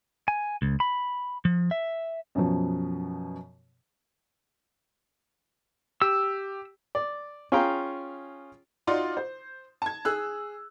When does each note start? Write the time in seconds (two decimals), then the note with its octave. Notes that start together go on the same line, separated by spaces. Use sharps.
0.28 G#5
0.62 C#2
0.80 B5
1.45 F3
1.71 E5
2.35 F#2 B2 F3
6.02 G4 E6
6.95 D5
7.52 C#4 F4 G#4 F5 G5 A#5
8.87 D#4 F4 F#4 D5 C6
9.17 C5
9.82 A5 G#6
10.05 G#4 E6 F#6